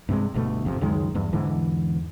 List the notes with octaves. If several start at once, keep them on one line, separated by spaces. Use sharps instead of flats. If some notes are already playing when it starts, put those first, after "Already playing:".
G2 C3 G3 G#3
G1 D2 B2 A3
G1 F2 G#2 C3
C#2 F#2 D#3 G#3
E2 G2
E2 G#2 D3 E3